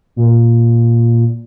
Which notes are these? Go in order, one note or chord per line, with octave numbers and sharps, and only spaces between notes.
A#2